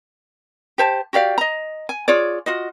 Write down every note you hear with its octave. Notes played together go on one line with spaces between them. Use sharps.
G4 C5 A5
F#4 G4 D5 F5
D#5 A#5
G#5
F4 G#4 C#5 D5
F4 F#4 D#5